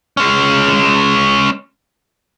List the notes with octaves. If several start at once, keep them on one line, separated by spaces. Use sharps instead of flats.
G#3 C#4